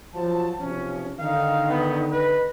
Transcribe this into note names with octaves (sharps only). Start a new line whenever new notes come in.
F3 F#3 A5
B1 C3 F3 C#4
D3 D#3 D#4 F5
B3
B4 D#5